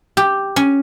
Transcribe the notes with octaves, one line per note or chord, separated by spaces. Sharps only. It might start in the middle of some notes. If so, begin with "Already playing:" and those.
G4
C#4